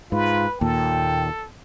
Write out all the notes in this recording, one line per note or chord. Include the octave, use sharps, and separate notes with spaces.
G#2 F4 B4
D#2 A#2 A4 G5